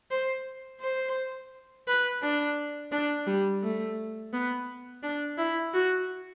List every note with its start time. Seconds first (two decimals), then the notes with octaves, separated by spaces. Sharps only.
0.11 C5
0.81 C5
1.88 B4
2.23 D4
2.92 D4
3.27 G3
3.63 A3
4.33 B3
5.03 D4
5.38 E4
5.74 F#4